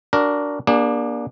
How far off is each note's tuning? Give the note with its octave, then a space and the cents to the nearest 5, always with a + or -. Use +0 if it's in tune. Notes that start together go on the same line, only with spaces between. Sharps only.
D4 -10 F#4 +5 A#4 +0
A#3 +30 D4 +0 G#4 -35